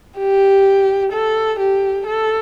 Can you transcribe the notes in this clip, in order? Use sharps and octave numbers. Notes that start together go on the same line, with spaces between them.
G4
A4
G4
A4